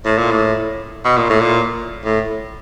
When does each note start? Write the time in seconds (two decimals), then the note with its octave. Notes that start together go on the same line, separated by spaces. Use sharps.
0.05 A2
0.18 A#2
0.31 A2
1.05 B2
1.17 A#2
1.29 A2
1.41 A#2
2.05 A2